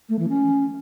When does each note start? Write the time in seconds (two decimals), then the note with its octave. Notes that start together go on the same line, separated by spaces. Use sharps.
0.09 A3
0.19 E3
0.29 C#4